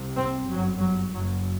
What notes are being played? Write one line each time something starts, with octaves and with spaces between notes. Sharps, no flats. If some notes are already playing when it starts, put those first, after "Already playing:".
Already playing: C2 C3
C4
G1 F#2 F#3
F#3
F#1 F#2 F#3